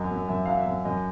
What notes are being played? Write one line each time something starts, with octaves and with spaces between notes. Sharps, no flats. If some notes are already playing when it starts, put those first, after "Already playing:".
Already playing: F#2 F#3 D#5
F#2
F#2 E5
F#3 F5
E5
F#2
F#2 D#5